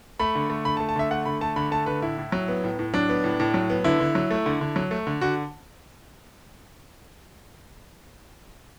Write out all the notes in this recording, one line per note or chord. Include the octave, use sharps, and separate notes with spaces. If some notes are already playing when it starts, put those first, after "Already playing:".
A3 B5
D3
A3
D3 B5
A5
A3
A5
D3 E5
A3 F#5
D3 B5
A3 A5
D3 B5
A3 A5
D3 B4
A2 E4
A2
F#3
B3
A2
A2
F#3 D4
B3
A2
A2
F#3
B3
D3 E4
D3
F#3
A3
D3
D3
F#3
A3
D3
D3 F#4